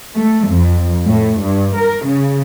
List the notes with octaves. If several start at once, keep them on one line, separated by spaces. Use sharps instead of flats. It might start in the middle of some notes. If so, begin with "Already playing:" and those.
A3
F2
A2
G2
A#4
C#3